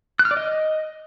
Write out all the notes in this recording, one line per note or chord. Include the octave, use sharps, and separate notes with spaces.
F#6
F6
D5
D#5